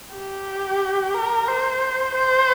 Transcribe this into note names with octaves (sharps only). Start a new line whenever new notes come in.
G4
A#4
C5
C5